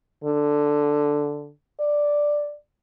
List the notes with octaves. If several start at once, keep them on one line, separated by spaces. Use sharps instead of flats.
D3
D5